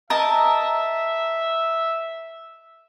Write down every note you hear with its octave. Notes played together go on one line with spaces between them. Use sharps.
A#4 D#5 E5 A5